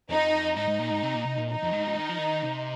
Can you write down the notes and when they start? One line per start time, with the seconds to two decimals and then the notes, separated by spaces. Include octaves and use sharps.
0.10 F2 D#4
0.56 G#2 D#4
0.67 G#2
0.79 A#2
0.91 G#2
1.03 C3
1.15 A#2
1.26 C3
1.38 A#2
1.49 D#4
1.62 F2
1.72 G#2
1.87 F3
1.95 D#3
2.09 F3
2.18 D#3
2.42 C3